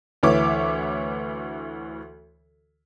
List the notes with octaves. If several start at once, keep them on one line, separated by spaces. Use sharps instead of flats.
D2 E3 C#5 E5 D6